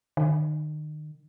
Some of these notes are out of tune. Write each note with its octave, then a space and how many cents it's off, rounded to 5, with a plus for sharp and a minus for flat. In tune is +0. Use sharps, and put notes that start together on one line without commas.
D#3 -35